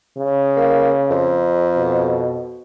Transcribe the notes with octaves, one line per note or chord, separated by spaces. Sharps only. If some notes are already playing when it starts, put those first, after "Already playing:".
C#3
A#3
F2
B2